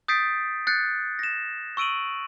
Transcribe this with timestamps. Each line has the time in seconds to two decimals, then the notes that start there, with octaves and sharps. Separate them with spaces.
0.08 D#6 G6 A6 B6 C7 D7
0.67 F#6 G6 A6 C7 C#7
1.19 A#6 E7
1.77 C#6 E6 D7 D#7 F#7